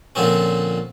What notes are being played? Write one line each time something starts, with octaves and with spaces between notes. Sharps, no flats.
A#2 D3 F3 C4 C#4